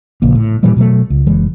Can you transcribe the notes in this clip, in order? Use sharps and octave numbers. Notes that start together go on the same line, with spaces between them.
A#1 C#3 A#3
A2
A#2 E3 F3 G3
B2 F#3 G#3 A3
C#2
F#1 E3 G#3